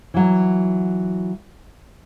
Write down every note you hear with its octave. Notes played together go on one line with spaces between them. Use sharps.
E3 F#3